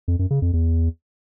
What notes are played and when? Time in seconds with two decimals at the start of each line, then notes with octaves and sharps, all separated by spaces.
0.08 F2
0.19 F#2
0.30 C#3
0.42 F2
0.53 E2